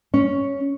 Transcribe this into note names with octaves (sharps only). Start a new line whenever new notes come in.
C#4